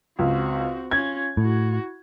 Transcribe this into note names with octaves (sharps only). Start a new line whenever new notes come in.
C#2 C4 F#4
C#4 F4 G#6
A2 E4 F#4